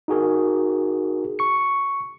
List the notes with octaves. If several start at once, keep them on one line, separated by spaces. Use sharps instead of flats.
D#4 F#4 G#4 A#4
C#6 C#7